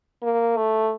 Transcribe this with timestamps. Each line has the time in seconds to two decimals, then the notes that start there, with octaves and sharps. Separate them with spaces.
0.23 A#3
0.57 A3